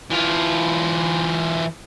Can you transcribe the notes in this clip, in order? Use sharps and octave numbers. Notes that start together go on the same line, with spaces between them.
E3 F4